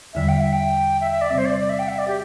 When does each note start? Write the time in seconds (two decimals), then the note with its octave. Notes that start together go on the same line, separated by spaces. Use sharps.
0.14 E2 D3 G3 E5
0.29 G5
0.41 E5
0.53 G5
1.01 E5
1.11 E5
1.21 D5
1.30 C3 G3 C4 E5
1.38 C5
1.46 D5
1.59 D5
1.69 E5
1.79 G5
1.89 E5
1.99 D5
2.08 G4